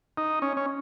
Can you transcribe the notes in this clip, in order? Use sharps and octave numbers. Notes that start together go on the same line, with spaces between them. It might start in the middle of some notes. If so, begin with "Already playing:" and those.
D#4
C#4
C#4